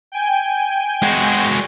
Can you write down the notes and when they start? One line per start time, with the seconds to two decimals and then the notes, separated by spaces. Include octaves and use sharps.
0.12 G5 G#5
1.02 G#3 F#4